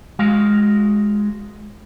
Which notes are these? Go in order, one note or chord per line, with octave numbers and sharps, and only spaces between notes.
G#3 F#4 F5